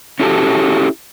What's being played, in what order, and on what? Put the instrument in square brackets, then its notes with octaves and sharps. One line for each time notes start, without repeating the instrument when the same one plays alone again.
[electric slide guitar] C#4 E4 F#4 G4 A4